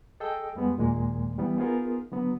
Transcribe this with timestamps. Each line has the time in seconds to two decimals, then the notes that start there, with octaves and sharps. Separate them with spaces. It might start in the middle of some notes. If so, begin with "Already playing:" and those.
0.20 G#4 A4 D#5 G5 E6
0.55 F2 G3 G#3 B3
0.77 D#2 A#2 D#3 G#3 A#3
1.38 E3 G3 B3
1.58 B3 D#4 F4 G#4 A#4
2.12 D3 F#3 B3